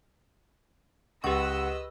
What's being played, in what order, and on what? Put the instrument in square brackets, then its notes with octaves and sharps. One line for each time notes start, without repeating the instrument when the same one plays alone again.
[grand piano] C#2 [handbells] G4 C#6 [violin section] B4 D#5 E6 [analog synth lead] F#5